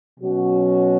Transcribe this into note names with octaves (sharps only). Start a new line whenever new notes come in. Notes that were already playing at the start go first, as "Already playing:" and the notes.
B2 F#3 C#4 F#4